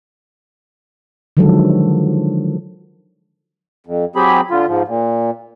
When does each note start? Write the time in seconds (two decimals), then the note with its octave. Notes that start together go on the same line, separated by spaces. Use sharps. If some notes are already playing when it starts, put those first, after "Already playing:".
1.37 D3 D#3 F3 F#3 G#3 A4
3.86 F2
4.16 F#3 C4 G4 G#4 B5
4.51 D3 F4
4.68 G#2 F3
4.88 A#2